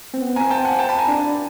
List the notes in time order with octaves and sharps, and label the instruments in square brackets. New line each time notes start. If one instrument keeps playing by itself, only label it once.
[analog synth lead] C4
B3
[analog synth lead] C4 [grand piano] G#5 A#5
[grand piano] G5 A5
F#5 G#5
G5 A5
A5 B5
G#5 A#5
[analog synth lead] D4